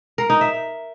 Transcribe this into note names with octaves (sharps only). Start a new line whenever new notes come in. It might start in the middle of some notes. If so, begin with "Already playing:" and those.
A#4
D#4
E5